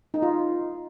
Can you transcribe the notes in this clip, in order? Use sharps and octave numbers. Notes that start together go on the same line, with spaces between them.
D#4
F4